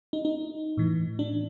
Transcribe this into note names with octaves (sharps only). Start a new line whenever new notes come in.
D#4
D#4
A2 E3
D4